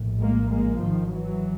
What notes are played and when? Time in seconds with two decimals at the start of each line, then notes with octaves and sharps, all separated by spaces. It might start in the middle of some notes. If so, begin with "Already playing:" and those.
Already playing: A#1 A2
0.18 G#3 A#3
0.49 G#3 A#3
0.79 G#1 G#2 D#3 F3
1.10 E3 F#3